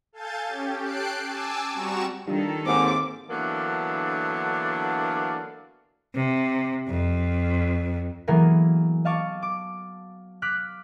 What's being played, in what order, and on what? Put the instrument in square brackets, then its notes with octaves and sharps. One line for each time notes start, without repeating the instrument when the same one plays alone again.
[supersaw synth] A4 F5 G#5 A5 G6 A6
C#4 G4
G5 A5 F#6 C7 D7
G#5 A5 D6 E6
G3 C4 F#4 A#5 C#6 E7
[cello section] D#3 A4 [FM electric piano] G3 D4 F4
[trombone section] D#2 G#2 [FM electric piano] C4 [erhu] D6
[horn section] D3 E3 F#3 A#3 B3 D4
[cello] C3
F2
[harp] E3 F#3 A#3 B3 G#4 A#4
D#5 F5 A5 C#6 D6
D6
D6 F6 F#6 B6